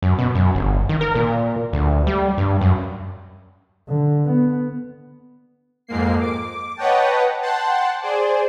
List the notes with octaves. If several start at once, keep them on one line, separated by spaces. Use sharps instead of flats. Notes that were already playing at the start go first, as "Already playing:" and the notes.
F#2
B2
F#2
G1
D#3
A#4
A#2
D2
G3
G2
F#2
D3
B3
F2 G#2 A#3 C7
D6
B4 C#5 D#5 F#5 G5 A5
F#5 G5 A5 C6
G#4 C5 D5